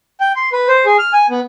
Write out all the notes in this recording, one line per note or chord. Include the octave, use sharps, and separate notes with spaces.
G5
C6
B4
C5
G#4
F6
G#5
B3